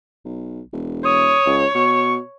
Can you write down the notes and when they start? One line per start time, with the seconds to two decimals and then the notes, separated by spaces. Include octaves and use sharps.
0.25 B1
0.73 E1
1.05 C#5 D#6
1.46 C#2
1.75 B2 C#6